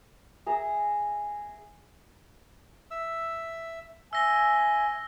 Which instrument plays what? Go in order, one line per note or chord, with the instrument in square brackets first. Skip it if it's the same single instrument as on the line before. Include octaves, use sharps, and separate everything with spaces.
[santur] G#4 E5 A#5
[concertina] E5 E6
[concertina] E5 [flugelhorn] G#5 [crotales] E6 A#6 G7